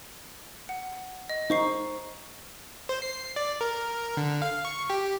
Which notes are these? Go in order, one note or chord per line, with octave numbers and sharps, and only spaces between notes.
F#5
D#5
D#4 C5 C#6 C7
C5
C7
D5
A#4
D3
F5
C#6
G4